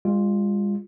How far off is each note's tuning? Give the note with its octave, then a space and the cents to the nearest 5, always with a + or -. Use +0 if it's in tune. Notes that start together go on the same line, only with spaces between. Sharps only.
G#3 -45 F4 +0